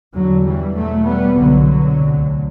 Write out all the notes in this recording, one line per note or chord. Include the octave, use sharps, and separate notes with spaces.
E2 B2 D3 F#3
E3 G3
E2 B2 F#3 A3
G3 B3
C2 B2 D3 F#3
D2 C3